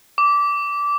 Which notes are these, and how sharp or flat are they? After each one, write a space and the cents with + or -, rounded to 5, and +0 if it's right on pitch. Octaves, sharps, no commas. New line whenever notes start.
D6 -15